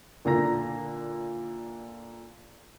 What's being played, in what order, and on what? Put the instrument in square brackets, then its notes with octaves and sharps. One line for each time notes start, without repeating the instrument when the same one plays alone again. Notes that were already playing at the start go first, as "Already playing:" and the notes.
[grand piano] A#2 D3 E4 A#5 A#6